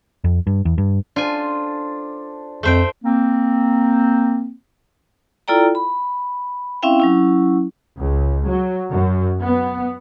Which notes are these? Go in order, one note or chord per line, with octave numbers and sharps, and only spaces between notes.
F2
G2
E2
G2
D4 F4 A4 C5 G#5
F2 A3 C5 G5
A#3 C4
E4 F4 A4 D5 G5 A#5
B5
C4 C#4 E4 E5 F5 G5
F#3 C#4 E4
C#2
F#3
F#2
B3